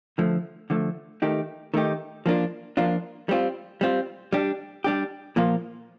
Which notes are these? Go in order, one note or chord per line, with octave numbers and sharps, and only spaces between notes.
D3 F3 A3
D3 F3 A3
D#3 A3 D#4 G4
D#3 A3 D#4 G4
F3 A#3 D4 F4
F3 A#3 D4 F4
G3 C4 F4
G3 C4 F4
G3 D4 G4
G3 D4 G4
A#2 F3 A#3 F4